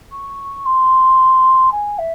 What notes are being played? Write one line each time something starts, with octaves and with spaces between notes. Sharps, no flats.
C#6
C6
G#5
E5